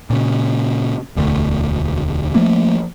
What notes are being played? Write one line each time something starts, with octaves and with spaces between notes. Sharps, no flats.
A#2 C#3
E1 D2 D3 A3
F3 A3 A#3